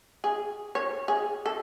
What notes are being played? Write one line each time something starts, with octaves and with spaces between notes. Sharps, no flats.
G#4
C#5
G#4
A4